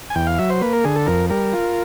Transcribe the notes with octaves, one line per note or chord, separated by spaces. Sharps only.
G#5
E2 G5
F5
F#3 E5
C5
A#3 B4
A#4
D3 G#4
A4
F2 A#4
G3 A#4
F4